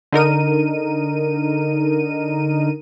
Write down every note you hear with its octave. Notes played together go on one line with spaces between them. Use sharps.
D3 D#4 A#4 D#7